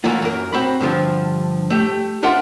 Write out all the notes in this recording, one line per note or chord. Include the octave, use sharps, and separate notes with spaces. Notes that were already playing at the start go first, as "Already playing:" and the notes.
E3 F#3 A3 A#3 F4
F#2 A#4
C4 F#4 B5
G2 D3 F3
A3 G4
D4 F4 A#4 E5 F#5 C6